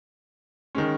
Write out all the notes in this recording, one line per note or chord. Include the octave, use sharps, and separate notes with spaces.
D#3 G#3 C#4